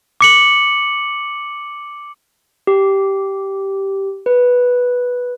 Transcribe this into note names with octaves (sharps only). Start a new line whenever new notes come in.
D6 C#7 F#7
G4
B4